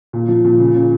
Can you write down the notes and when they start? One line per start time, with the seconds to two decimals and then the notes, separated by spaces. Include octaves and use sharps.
0.13 A#2
0.28 F3
0.45 A#2
0.59 C#3
0.75 C#3